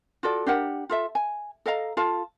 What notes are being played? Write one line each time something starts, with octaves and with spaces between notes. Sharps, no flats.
F4 F#4 A4 D5
D4 G4 A#4 F#5
F4 A4 E5
G#5
A4 D#5 F5 A#5
F4 A4 F5 A5